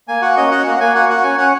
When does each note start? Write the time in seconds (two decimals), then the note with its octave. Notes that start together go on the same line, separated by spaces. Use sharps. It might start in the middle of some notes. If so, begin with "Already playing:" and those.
0.08 A#3 G#5
0.22 F#4 F#5
0.37 C#4 D#5
0.51 F#4 F#5
0.66 A#3 F#5
0.80 A#3 G#5
0.94 F#4 F#5
1.10 F#4 F#5
1.23 C#4 G#5
1.38 C#4 F#5